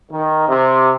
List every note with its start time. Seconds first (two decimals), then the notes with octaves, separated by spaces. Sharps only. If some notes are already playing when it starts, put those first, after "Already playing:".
0.11 D#3
0.48 C3